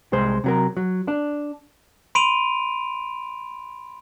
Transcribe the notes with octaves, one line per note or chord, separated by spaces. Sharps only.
C2 G#3 C5
C3 F#3 A#4
F#3
D4
B5 C6 D7 D#7 F7